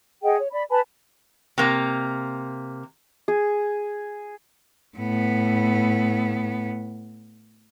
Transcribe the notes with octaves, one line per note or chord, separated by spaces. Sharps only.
G#4 D#5 F#5 G5
C#5
D5 B5
B4 G#5 A5 B5
C3 A#3
G#4
A2 B3